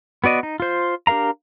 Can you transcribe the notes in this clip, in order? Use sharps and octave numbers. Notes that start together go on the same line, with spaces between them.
B3 F#4 D5 D#5
D#4
F4 C5
D4 G4 A#4 F5 A#5